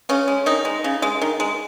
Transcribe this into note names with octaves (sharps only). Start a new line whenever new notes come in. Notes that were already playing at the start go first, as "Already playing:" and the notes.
C#3 C#4
G#3
D#3 D#4
G#3
C#3
G#3
D#3
G#3